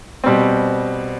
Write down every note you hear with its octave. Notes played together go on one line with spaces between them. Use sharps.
B2 G3 C4